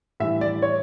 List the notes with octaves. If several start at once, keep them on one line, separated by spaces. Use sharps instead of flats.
A2 E3 G3 E5
D5
C#5